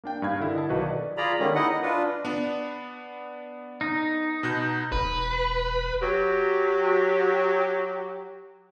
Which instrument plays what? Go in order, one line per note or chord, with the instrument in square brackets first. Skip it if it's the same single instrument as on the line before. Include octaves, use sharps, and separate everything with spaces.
[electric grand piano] A#3 D4 G5
G2 D#4 F5 G#6
D3 E4 A#4
D#5 A5
B1 D#3 F#4 B4
D5
[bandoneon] F4 G#4 D5 A#5 B5
D3 D#3 G3 G#3 A#3 C#4
D#4 E4 D#5 F#5
D#5
D4 F4 B4
[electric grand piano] B3 D4
[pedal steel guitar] D#4
[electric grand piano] B2 F#6 G6
[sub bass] E1 [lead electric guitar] B4
[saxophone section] F#3 G4